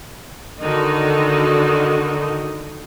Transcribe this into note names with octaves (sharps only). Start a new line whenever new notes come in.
D3 D#3 D#4 F#4